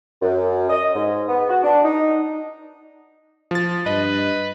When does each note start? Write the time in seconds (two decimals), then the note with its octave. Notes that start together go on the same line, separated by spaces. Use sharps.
0.22 F#2
0.70 D#5
0.94 G#2
1.28 B3
1.49 F#4
1.63 D4
1.83 D#4
3.51 F3 A6
3.86 G2 B4 D#5